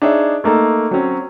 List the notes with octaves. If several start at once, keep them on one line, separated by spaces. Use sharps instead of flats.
D4 D#4 G#4 C#5 E5
A3 A#3 D#4 A4
F#3 C4 C#4